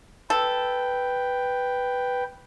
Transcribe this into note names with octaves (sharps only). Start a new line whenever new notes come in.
A4 B4 G5